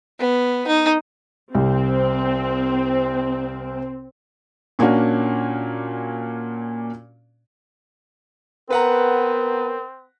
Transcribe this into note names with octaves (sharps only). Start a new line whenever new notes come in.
B3
D#4
C2 C4
A#2 A#3 C#4 D4 F#4
B3 C4 A#4 B4 F#5 A#5